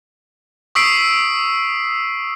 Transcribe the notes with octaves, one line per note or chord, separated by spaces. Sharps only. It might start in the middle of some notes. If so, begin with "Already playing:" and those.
C#6 D#6 E6 B6 C7 D7